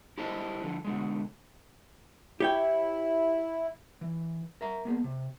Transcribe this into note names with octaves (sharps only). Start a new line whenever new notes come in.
E4 G4 A4 C5 D#5
D3 F3
B2 D3 G#3
E4 G4 C#5 G5
E3
A#4 E5 A#5
A#3 B3 G#4
C3